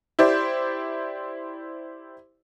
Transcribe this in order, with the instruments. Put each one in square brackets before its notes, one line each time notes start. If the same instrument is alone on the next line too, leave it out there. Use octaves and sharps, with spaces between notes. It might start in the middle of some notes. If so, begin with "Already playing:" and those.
[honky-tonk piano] E4 G4 C5 D5